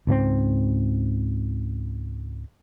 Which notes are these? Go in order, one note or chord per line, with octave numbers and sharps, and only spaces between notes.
C#2 G#2 A3 C4